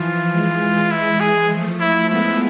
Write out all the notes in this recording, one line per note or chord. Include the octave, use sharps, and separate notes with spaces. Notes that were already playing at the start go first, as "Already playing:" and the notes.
Already playing: E3 F3 F4
E3 G#3
E4
G#4
F3 A3
E4
G#3 B3 E4